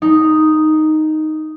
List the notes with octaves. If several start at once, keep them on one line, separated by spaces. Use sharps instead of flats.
D#4